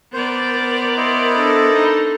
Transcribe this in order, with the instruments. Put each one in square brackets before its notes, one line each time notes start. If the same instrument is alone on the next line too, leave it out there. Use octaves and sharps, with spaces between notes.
[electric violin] B3 D5 [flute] A#4 [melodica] C5
[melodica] E4 C5 D#5 [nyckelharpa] C6
[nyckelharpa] D4 A4
[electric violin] D#4